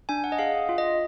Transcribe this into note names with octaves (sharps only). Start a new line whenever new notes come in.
D4 G#5
F#5
D#5
G#4 F5
F4
D#5